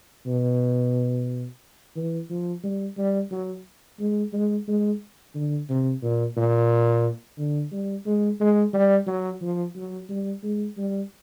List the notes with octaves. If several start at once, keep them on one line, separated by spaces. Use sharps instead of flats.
B2
E3
F3
G3
G3
F#3
G#3
G#3
G#3
D3
C3
A#2
A#2
D3
G3
G#3
G#3
G3
F#3
F3
F#3
G3
G#3
G3